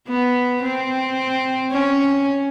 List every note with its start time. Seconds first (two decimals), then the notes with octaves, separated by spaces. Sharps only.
0.09 B3
0.63 C4
1.71 C#4